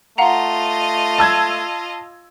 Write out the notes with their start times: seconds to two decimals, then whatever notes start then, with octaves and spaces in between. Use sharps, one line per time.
0.18 A3 F4 D#5 F5 F#5 A#5
1.18 A5 E6 G#6